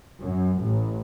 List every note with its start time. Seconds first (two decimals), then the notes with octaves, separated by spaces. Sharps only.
0.22 F#2
0.63 A1